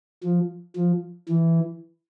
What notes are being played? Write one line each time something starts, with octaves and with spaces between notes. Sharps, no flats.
F3
F3
E3